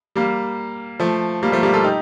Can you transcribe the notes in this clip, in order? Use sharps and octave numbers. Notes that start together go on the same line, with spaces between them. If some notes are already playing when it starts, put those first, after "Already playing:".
G3 A#3
F3 A3
G3 A#3
F3 A3
G3 A#3
F4 A4
D#4 G4